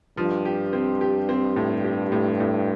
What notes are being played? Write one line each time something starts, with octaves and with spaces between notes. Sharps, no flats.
G2 F3
G4
C4
G4
C4
A2
G4
A2
A2